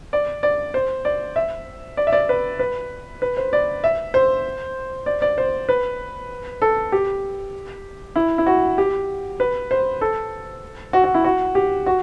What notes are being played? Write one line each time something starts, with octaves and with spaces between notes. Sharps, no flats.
D5
D5
C5
D5
E5
D5
E5
D5
B4
B4
B4
C5
D5
E5
C5
D5
D5
C5
B4
A4
G4
E4
E4
F#4
G4
B4
C5
A4
F#4
F#4
E4
F#4
G4
F#4